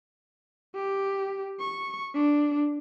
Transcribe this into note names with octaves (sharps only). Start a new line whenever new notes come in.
G4
C#6
D4